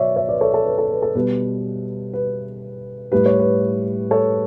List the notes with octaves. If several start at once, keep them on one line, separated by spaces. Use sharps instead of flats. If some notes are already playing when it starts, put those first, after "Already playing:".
Already playing: B2 F#3 C#5 D5 E5
C#5 E5
B4 D5
A4 C#5
A4
B4
A4
B4
A4
B2 G3 B4
B4
A2 G3 B4
C#5
B4
A4 C#5